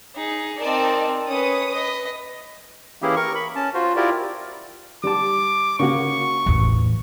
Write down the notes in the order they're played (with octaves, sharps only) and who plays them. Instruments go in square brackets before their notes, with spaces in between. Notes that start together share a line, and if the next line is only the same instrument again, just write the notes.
[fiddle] D#4 G#4
[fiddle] C4 A#4 [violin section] D#4 D5 A5
[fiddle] C#4 B4 [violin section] D#6
[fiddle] B4 D#5
[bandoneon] E3 A#3 C#4 E4 G4 G#4
A#4 C#6
B5
C#4 A5
F4 F#4 C5
E4 F4 G4 A#4 D5
[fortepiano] G3 A5 [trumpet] D6
[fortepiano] C#3 A#3 F#4 [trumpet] C#6
[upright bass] A1 E2